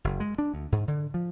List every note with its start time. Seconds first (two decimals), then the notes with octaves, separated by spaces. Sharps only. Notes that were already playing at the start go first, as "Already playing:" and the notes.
0.04 F#1
0.20 G#3
0.38 D4
0.54 D2
0.72 G#2
0.88 D3
1.14 F3